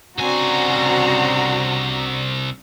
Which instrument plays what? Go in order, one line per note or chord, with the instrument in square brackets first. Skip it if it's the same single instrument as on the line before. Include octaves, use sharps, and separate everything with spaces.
[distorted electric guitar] C2 G#5 [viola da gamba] C#3 C4 D4 [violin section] F#4 A#5